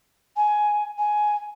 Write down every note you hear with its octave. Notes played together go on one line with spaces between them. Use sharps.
G#5
G#5